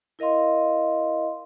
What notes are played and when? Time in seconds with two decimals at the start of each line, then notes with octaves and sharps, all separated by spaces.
0.19 E4 A#4 D#5 F5 C6